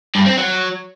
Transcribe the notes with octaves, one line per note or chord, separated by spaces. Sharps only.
G2
C4
F#3